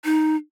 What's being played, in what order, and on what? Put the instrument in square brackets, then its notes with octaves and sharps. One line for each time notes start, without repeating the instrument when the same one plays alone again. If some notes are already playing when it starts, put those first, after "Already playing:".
[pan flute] D#4